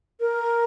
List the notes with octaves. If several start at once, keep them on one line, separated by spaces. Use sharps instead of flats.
A#4